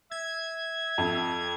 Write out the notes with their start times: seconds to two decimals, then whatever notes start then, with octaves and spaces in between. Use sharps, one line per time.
0.11 E5 G#6
0.98 F2